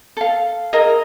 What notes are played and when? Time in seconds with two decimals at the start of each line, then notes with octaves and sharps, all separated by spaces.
0.17 A4 F5
0.73 E4 G#4 A#4 D#5